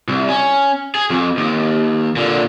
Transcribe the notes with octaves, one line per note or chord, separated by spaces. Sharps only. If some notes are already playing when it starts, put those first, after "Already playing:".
C2
C#4
G#4
F2
D#2
A#2 D3